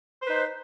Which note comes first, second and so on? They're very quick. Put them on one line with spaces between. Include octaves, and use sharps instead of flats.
C5 B4 D#4